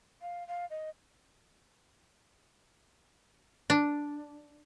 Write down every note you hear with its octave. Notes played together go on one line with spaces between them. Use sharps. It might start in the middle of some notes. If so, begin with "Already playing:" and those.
F5
F5
D#5
D4